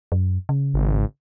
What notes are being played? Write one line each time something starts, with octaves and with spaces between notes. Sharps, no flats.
F#2
C#3
G#1